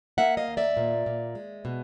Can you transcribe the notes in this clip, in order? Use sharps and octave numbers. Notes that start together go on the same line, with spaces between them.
A#3 E5 F#5
D#5 F5
D#2
D5 E5
A#2
A#2
G#3
B2